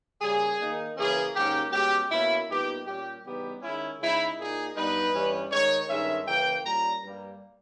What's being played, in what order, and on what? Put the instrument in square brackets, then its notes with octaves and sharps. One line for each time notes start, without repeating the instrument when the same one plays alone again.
[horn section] C#3 G3 A#3 G#4
D#3 A#3 D#4
C#3 E3 A#3 C#4 G#4
G#2 D#3 A#3 C#4 G4
B2 G#3 C#4 G4
B2 A#3 C#4 E4
A#2 G3 B3 D#4 G4
A#2 G3 C#4 G4
C#3 E3 G3 B3 D#4 G4
D#3 G#3 C#4 E4
C#3 G#3 D#4 E4
A#2 A#3 D#4 G#4
G2 G3 B3 D#4 B4
G2 E3 G3 C#4
D#3 G#3 D#4 C#5
G2 D#3 G#3 C#4 E5
C#3 E3 A#3 G5
A#2 G3 C#4 A#5
G2 G3 A#3